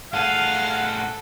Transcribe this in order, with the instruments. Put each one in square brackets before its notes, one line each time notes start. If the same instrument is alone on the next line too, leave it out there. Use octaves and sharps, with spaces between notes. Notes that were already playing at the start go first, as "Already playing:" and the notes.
[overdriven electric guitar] A2 G#4 [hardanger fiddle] A4 [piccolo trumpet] F5 [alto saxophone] F#5